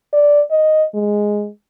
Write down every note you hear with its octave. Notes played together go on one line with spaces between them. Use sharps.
D5
D#5
G#3